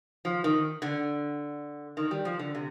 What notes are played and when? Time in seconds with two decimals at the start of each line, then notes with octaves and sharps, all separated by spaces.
0.25 F3
0.44 D#3
0.82 D3
1.97 D#3
2.11 G3
2.25 F3
2.39 D3
2.55 C3